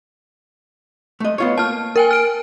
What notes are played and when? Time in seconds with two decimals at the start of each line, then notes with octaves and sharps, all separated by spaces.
1.20 A3 D#5
1.38 B3 F4 C#5
1.57 A#3 A5 F6
1.96 A#4 G5 G#5
2.11 F6 D7